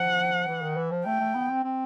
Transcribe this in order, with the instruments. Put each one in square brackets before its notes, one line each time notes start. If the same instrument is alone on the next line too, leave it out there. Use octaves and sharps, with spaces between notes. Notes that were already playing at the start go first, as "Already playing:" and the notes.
Already playing: [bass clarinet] F3 [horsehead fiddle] F#5
[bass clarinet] E3
D#3
E3
F3
[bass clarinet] A3 [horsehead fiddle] G5
[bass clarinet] A3
B3
C4
C4